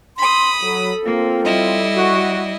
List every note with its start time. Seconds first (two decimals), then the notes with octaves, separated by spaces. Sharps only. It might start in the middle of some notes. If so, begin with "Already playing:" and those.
0.18 B5 C6 D#6
0.62 F#3 A4
1.05 A#3 C4 F4
1.45 G3 E4 D#5
1.96 F#4